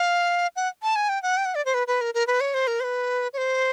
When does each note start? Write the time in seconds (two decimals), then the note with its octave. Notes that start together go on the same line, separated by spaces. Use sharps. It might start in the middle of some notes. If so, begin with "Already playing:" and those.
Already playing: F5
0.56 F#5
0.83 A5
0.96 G#5
1.09 G5
1.23 F#5
1.37 G5
1.45 F#5
1.55 D5
1.66 C5
1.74 B4
1.87 B4
2.01 A#4
2.14 A#4
2.27 B4
2.41 C#5
2.54 C5
2.67 A#4
2.80 C5
2.84 B4
3.33 C#5
3.38 C5